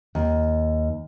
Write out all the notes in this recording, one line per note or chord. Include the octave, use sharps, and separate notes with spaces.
D#2